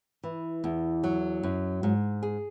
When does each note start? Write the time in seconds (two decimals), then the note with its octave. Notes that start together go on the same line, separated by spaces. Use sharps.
0.23 E3
0.64 E2
1.04 F#3
1.43 F#2
1.83 G#2
2.23 G#4